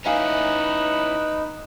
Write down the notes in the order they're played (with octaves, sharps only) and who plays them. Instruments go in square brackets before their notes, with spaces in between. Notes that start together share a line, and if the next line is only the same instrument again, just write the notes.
[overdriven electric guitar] C#4 E4 [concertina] D#4 [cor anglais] B4 [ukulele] E5 F5 G#5